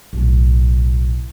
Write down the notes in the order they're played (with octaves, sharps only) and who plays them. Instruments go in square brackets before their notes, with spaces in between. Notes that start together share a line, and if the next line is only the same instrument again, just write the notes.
[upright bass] B1 A2